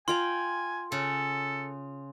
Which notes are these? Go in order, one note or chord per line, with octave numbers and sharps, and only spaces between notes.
F4 G5 G#5 A#5 C6
C#3 A4